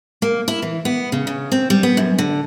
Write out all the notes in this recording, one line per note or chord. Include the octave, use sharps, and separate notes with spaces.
A#3
E4
E3
B3
C#3
C#3
C4
G3
B3
F#2
D3